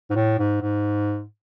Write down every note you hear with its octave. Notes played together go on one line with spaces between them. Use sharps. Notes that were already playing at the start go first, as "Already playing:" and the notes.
G#2
A2
G#2
G#2